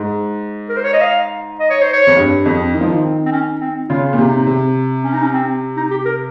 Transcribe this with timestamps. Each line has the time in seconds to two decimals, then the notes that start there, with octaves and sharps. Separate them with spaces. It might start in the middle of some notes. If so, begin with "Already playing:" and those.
Already playing: G#2
0.69 A#4
0.77 C5
0.84 C#5
0.93 D#5
1.01 F5
1.59 D#5
1.70 C#5
1.82 C5
1.93 C#5
2.07 F2
2.17 G2
2.46 F2
2.74 D#3
2.81 F3
2.89 D#3
3.04 C4
3.26 C4
3.32 C#4
3.60 C4
3.89 C#3 F4
4.13 A#2
4.18 C3 D#4
4.47 C3
5.04 C#4
5.13 D#4
5.22 C#4
5.33 C4
5.77 D#4
5.91 G4
6.05 A#4